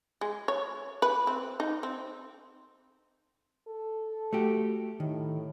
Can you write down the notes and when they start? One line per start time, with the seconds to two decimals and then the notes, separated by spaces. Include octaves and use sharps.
0.21 G#3
0.48 C#5
1.02 B4
1.27 C4
1.60 D#4
1.83 C4
3.68 A4
4.33 A3 F#4 G4
5.00 A2 D#3